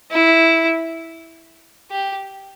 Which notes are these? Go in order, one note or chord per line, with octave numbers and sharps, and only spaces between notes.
E4
G4